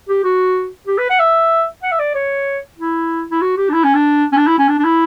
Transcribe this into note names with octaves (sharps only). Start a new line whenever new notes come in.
G4
F#4
G4
B4
F#5
E5
F#5
E5
D5
C#5
E4
E4
F#4
G4
D4
E4
C#4
D4
C#4
D4
E4
C#4
D4
D4
E4